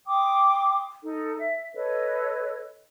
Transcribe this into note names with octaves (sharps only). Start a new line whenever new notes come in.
G5 C6 D6 D#6
D#4 A4
E5
A4 B4 C#5 D#5